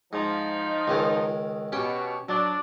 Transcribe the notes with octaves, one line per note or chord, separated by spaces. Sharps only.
G#2 F3 D#4
C#2 D#3 G#3
B2 C#4 G4 G5
F#3 D4 D5